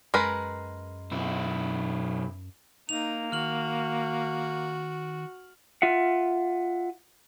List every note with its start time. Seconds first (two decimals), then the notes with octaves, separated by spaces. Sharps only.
0.14 F#2 G#3 A#4 B4
1.11 B1 E4
2.89 A#3 D#4 F7
3.32 D#3 F#4 F6 F#7
5.82 F4 E5 F#5